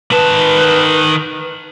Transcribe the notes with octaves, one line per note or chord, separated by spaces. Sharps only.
D#3 B4 A5